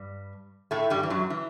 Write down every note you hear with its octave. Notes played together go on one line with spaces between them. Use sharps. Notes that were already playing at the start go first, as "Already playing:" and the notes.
Already playing: G2 G3
A2 A3
G2 G3
E3
F#2 F#3
E3